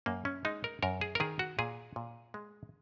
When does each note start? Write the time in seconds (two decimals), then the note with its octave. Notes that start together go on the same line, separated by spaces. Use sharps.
0.06 F#2 A#3
0.25 C#4
0.45 G#3 D#4
0.64 A#4
0.83 F#2 A#4
1.01 G#4
1.15 A#4
1.20 D#3 G#4
1.39 F#4
1.59 A#2 G#4
1.96 A#2
2.34 G#3